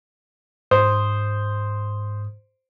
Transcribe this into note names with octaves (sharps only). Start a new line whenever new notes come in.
G#2 C5 D#6